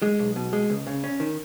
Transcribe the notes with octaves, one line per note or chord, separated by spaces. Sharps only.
G#3
B1
B2
G#3
C#2
C#3
C#4
D#3